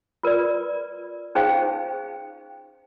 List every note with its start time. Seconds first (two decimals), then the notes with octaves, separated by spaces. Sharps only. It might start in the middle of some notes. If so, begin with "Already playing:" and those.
0.23 F4 A#4 B4 D5
1.35 C#4 D#4 G#4 C5 F5 G5